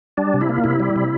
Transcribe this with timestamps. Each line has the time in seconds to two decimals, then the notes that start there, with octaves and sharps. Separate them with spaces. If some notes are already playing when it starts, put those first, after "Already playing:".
0.17 G3 D4
0.34 C3
0.41 E4
0.49 A#3
0.64 C3 E4
0.80 G3
0.96 C3